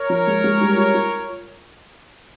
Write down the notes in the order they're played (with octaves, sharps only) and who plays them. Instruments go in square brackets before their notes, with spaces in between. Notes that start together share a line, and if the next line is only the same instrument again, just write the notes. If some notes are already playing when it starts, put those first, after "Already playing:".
Already playing: [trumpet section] A#4 C#5
[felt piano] F3
G#3
G#3
G3
F4
F4